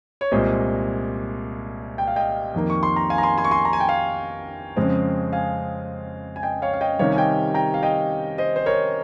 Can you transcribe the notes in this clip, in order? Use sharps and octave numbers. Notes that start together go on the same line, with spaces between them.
C#5
C2 A#2 G#3 C5 D#5
G5
F5
D#5 G5
F2 D#3 A#3
C#6
C6
A#5
F5 G#5
A#5
G#5 C6
G#5 C6
C#6
G#5 C6
A#5
G#5
G5
F5 G#5
F2 C#3 G#3 C4
F5 G#5
G#5
D#5 G5
C#5 F5
F5
D#5 G5
C3 D#3 G3 C4 C#5 F5
G#5
D#5 G5
G5 A#5
F5
D#5 G5
C5 D#5
C5
A#4 C#5